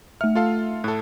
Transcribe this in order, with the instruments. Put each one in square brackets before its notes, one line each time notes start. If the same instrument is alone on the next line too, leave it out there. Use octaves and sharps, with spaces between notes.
[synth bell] A3 E5 [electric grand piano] F6
[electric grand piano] F4 A4 F5
[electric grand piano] A2 A4 [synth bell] F#6